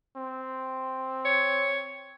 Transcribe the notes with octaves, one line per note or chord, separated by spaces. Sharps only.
C4
C#5